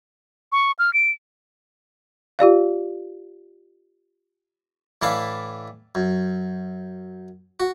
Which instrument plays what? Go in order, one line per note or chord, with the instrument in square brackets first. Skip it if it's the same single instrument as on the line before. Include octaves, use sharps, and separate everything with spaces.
[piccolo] C#6
F6
D7
[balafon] F4 G4 D5 F5
[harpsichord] A2 E3 D4 E4 F5 A5
F#2
F#4